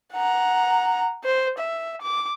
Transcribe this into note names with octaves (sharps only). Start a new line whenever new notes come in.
F#5 A#5
C5
E5
D6